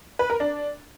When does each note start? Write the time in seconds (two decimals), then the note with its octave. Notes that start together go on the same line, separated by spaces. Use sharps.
0.19 B4
0.30 A#4
0.40 D4